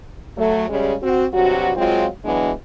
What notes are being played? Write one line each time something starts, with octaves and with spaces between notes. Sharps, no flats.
F#3 A3
C#3 G3 G#3 C#4 G#4
C4 F#4
G2 C3 F#3 F#4
F#3 G#3 C4 F4
E3 F#3 G#3 B3 D4